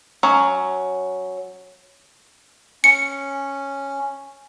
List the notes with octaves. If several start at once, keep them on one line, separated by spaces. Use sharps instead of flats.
F#3 C#4
C#4 C#7